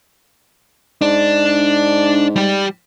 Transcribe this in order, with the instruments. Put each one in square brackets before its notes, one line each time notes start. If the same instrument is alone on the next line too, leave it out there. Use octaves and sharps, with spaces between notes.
[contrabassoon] G#2 [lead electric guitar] D4 D5
[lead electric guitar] G3 G4